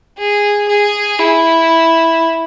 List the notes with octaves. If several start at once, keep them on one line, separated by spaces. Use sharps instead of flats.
G#4
G#4
E4